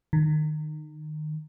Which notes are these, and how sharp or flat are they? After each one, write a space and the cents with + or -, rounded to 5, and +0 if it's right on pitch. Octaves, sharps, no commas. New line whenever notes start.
D#3 -25